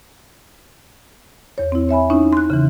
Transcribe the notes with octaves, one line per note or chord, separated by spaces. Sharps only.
E2 C#5
C4 E4
C#5 E5 G#5 B5
C#4 D#4 E4
C6 F#6
C#3 E3